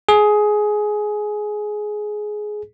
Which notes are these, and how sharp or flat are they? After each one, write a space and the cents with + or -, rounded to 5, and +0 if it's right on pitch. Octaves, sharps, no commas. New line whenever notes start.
G#4 +15